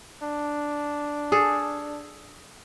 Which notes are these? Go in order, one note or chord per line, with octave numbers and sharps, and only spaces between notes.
D4
G#4 A4